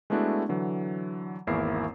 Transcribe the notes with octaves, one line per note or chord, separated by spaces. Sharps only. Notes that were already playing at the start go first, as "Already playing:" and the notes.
G#3 A3 B3 D4 E4 F#4
D3 E3 F#3
G#1 E2 A#3 E4 A#4 C7